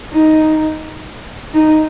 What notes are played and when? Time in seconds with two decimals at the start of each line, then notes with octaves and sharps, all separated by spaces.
0.12 D#4
1.54 D#4